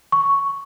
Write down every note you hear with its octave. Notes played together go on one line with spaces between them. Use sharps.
C#6